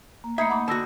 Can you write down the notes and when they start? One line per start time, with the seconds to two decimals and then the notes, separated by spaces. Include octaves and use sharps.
0.24 A#3
0.38 A3 D#4 E5 B5 G#6 C7 C#7
0.49 A#3 F#5 B5 D6
0.68 D3 F#4 A5 E6 A#6